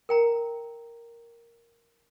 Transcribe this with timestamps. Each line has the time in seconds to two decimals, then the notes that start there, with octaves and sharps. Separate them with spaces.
0.09 A#4 G5 A#5